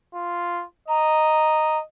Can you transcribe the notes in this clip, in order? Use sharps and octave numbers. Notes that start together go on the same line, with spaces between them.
F4
D#5 A#5